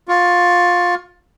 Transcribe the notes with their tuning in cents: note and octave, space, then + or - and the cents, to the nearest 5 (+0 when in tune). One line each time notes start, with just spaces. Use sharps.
F4 +20 C#6 +20